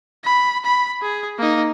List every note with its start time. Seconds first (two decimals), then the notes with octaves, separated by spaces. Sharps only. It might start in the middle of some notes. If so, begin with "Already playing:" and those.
0.24 B5
0.65 B5
1.02 G#4
1.38 A#3 D#4